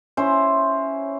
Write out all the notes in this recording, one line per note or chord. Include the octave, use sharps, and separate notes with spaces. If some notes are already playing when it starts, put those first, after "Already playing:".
C#4 E4 C5